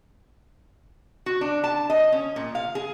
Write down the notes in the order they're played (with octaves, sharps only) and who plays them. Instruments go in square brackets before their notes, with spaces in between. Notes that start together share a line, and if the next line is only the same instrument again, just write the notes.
[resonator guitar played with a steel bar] F#4
D4
A5
D#5
C#4
A#2
F5
G#4